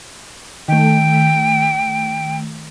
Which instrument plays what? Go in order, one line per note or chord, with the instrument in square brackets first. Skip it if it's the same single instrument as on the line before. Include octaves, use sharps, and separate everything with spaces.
[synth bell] D#3 A3 [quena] G5